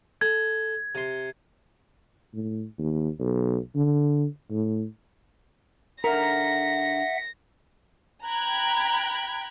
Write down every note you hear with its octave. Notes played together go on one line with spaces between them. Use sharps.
A4 G#6
C3 C6
A2
D#2
B1
D3
A2
D3 A#4 E5 F#5 A#5 A#6
G5 A#5 B5 F#6 G#6